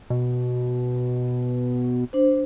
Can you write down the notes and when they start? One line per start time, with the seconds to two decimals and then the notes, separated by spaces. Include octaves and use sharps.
0.10 B2
2.13 D4 C5